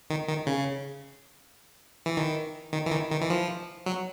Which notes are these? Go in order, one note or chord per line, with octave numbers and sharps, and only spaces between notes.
D#3
D#3
C#3
E3
D#3
D#3
E3
D#3
D#3
E3
F3
F#3